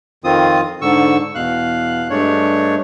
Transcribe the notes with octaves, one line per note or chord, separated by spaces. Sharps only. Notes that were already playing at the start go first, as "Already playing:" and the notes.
F2 D#3 C4 F4 D#6
G#2 D3 C#6 E6
E2 B2 F5 F#6
G2 G#3 A3 D4 C#5